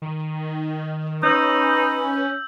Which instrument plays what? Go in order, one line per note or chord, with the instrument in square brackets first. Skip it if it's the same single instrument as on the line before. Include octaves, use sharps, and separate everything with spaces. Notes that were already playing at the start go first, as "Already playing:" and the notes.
[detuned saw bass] D#3
[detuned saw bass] C#4 [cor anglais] D#4 [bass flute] B4 [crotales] E6 G6